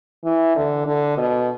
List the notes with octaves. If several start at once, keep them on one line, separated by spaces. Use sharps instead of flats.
E3
D3
D3
B2